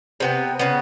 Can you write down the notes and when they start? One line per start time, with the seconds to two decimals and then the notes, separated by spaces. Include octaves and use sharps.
0.20 C3 B3 G5
0.59 C#3 B3